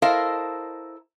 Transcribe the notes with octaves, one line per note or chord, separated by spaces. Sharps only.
E4 A4 A#4 C5 D#5 F5